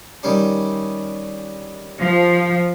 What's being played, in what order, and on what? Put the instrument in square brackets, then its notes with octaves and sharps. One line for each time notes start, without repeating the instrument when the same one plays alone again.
[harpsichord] D#3 G3 C#4
[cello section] F3